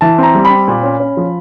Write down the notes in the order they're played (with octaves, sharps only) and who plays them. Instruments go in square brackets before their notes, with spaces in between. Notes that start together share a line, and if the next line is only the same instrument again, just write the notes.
[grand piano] E3 A5
C4 A#5
G3
B5
C4
A#2
C#4
C#4
F3